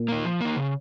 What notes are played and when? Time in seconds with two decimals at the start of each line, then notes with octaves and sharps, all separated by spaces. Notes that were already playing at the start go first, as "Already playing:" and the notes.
Already playing: A#2
0.08 A#3 D#4
0.24 F3
0.41 A#3 D#4
0.56 C#3